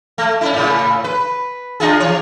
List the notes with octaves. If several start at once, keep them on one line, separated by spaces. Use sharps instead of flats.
A3
C#4 D#4 E4
A2 C#3
B4
D4 F4 G#4
E3 C#5